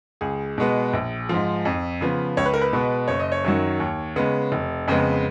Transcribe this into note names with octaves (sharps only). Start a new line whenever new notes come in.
C#2 G#4
B2 G#3 B3
A#1
G#2 F3
F2
C#3 F3 B3
C#2 C#5
B4
A#4
B4
B2 G#3 B3
F#1 C#5
D#5
C#5
F#2 D#3 F#3
D#2
C#3 G#3 B3
F1
F2 C#3 G#3 B3